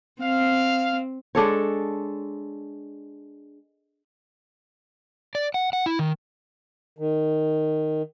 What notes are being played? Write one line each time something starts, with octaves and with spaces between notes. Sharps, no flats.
C4 F5
G#3 D4 A4 C#5
D5
F#5
F#5
E4
D#3
D#3